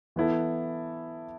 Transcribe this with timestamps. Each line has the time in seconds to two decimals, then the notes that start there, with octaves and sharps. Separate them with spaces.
0.16 E3 B3 E4 A4